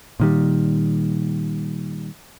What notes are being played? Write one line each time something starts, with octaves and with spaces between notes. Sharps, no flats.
A#2 D#3 G3